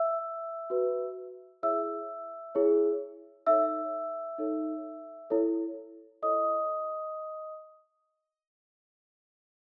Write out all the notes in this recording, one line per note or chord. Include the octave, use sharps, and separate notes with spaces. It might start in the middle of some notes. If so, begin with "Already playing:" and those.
Already playing: E5 E6
F#4 B4
E4 G#4 C#5 E5 E6
E4 G#4 C#5
D#4 A4 C#5 E5 E6
D#4 A4 C#5
E4 A4 C#5
E4 A4 C#5 D#5 D#6